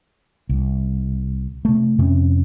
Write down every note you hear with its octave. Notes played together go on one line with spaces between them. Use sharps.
C2
C3 A3
F2 C3 C#4